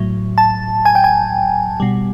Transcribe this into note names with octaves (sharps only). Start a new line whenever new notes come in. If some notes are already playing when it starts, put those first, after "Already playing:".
Already playing: A2 F#3
A5
G#5
G5
G#5
B2 G3